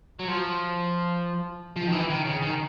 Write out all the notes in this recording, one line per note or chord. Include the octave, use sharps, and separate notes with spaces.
F#3
F3
F3
D#3
E3
D#3
C#3
D#3